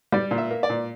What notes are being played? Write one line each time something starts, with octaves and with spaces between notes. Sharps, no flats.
G3 D5
A#2
E5
A#3
D5
A#2